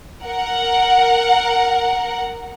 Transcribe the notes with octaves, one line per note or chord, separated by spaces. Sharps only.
A#4 F#5